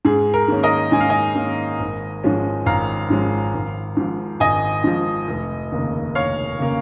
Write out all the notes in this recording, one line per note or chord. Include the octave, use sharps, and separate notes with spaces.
G#2 G#4
A#4
D#3 A#3 C#4
A#4 D#5
G#2 G#5
F5
D#5 G#5
D#3 A#3 C#4
G#1
G#2 F3 G#3 C#4
G#1 F5 A#5
G#2 F3 G#3 C#4
G#1
G#2 F3
G#1 D#5 G#5
G#2 F3
F1
D#2 C#3 A#3
F1 C#5 F5
C#3 A#3